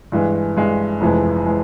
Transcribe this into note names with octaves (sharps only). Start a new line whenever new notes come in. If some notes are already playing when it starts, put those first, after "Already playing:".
G2 E3 G#3
G2 E3 G#3
F1 F2 E3 G#3
E3 G#3